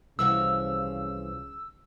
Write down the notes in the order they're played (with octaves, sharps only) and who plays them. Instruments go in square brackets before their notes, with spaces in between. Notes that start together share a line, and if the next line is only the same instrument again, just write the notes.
[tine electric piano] C2 [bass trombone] C#3 [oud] E3 F3 F#4 [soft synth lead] E6